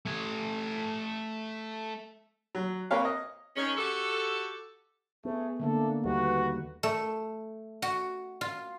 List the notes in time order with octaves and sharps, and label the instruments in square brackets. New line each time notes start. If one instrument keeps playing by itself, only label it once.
[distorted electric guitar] A3 G#5
[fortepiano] F#3
A#3 C4 B4 C#5 F5
D#5
[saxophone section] D#3 G#3 C#4
F#4 G4 A4
[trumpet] A3 [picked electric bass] B3 [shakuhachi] G#4
[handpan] D3 A3 A#3 [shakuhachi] D4 [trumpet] A4
[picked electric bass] D#2 D#3 G3 [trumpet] F#4 [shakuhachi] B4
[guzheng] A3
F#4
F4